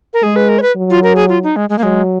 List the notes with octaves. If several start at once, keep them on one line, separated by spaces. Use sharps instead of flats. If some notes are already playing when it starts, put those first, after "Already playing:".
A#4
G#3 G#4
B4
A#4
C#5
B4
F#3
F4
A#4
G#4
F4
D#4
G#3
G#3
A#3
F#3 G#3